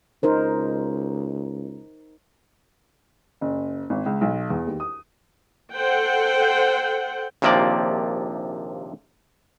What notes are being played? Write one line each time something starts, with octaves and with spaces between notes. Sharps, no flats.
C#2 D#4 A#4 C5
F#1
G#1
C#2
B1
E2
D#2
D#6
A4 C5 F#5 G5
A#1 D#2 C3 F3 A#3 D5